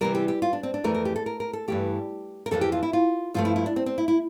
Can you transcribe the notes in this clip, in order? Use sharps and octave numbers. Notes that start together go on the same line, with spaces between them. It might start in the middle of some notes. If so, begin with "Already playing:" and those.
C3 E3 G3 A#4
G4
G4
F4
D4
C4
D4
F2 E3 A3 A#4
A#4
G4
A4
A#4
A#4
A4
G2 E3 A3 G4
A#4
F2 E3 G3 A#3 A4
G4
F4
E4
F4
G2 F3 A3 F4
E4
E4
D4
C4
C4
E4
E4